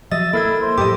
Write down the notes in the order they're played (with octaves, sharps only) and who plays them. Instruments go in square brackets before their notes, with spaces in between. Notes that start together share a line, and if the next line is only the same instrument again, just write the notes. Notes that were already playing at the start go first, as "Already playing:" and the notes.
[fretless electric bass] F3 F#3 [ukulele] D#5 [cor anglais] E5 [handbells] A6
[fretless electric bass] A#3 [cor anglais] E4 [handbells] A4 A#4 G#6
[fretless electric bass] A#3
[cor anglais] C5
[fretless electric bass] F2 A2 F#3 [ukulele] G4 A4 D#5 [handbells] D6